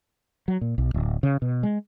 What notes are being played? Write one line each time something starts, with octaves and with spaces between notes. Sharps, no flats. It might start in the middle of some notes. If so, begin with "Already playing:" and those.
F#3
A#2
B1
D1
C#3
B2
G#3